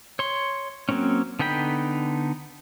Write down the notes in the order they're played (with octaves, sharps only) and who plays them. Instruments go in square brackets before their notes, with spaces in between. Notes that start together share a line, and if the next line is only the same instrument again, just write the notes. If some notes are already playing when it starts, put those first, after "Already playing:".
[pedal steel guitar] C#5 C6
F#3 A#3 C4 C#4
D3 B3 D#4 G5 B5